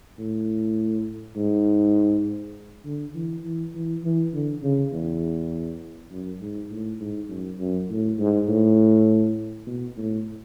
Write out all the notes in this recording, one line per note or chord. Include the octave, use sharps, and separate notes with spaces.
A2
G#2
D3
E3
E3
E3
E3
D3
C#3
E2
F#2
G#2
A2
G#2
F#2
F#2
A2
G#2
A2
B2
A2